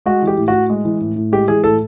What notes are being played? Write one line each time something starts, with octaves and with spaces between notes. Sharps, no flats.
G#3 F#4
E3 G4
A2
F#4
A2
G#3
E3
A2
A2
G#3 G4
E3 G#4
A2 A4